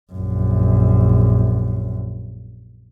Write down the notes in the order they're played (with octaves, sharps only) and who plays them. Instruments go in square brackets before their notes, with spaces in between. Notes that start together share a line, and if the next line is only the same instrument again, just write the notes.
[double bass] A#1 F#2